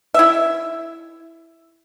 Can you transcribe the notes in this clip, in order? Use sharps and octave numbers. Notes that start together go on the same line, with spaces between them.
E4 E5